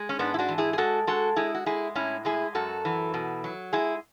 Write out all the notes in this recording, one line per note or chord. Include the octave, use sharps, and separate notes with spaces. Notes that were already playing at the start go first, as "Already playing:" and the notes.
Already playing: G#3
C#4
G#2 B3 D4
E4
D4 F#4
E3
E4 G#4
G#4
G#3 F#4 A4
G#3 F#4 A4
G#3 E4 G#4
F#4
G#3 E4 G#4
A2 C#4 E4
G#3 E4 G#4
F#2 F#4 A4
E3
B2
F#3
G#3 E4 G#4